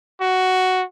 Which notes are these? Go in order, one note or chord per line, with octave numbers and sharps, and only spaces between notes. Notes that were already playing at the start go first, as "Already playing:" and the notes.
F#4